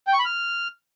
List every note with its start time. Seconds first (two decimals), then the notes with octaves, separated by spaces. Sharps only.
0.07 G5
0.13 C#6
0.19 B5
0.25 F6